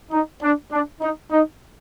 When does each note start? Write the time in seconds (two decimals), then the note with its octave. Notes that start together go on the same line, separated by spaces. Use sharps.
0.11 D#4
0.42 D4
0.71 D4
1.01 D#4
1.31 D#4